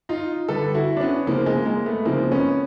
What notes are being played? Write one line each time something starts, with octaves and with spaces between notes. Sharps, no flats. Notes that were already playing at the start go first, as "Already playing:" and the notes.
D#4 F4
D3 G3 A4 B4
E4 F#4
D4
B3 C#4
C#3 F3 G#3 A#3 C4
G#3 A#3
G#3 A#3
A3 B3
C#3 F3 G#3 A#3 C4
B3 C#4